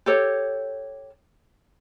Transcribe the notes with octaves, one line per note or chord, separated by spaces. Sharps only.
G4 A4 C#5